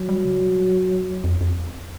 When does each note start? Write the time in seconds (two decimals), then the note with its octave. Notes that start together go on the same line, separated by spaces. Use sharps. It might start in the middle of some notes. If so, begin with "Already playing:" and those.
Already playing: F#3
0.09 G3
0.25 C#3
0.41 B2
0.58 A#2
0.75 G2
0.91 F#2
1.07 F2
1.24 F2
1.41 F2
1.57 E2